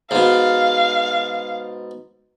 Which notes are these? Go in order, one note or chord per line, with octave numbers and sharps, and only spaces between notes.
G#2 B2 F5